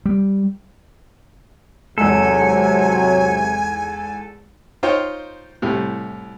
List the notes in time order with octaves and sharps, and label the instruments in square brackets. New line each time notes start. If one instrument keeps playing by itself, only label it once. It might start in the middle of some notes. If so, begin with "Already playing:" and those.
[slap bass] G3
[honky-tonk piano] E2 G#2 [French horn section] C3 F#3 [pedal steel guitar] A4 [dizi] G#5
[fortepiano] D#4 F4 C5 C#5 G5
C2 A2 C3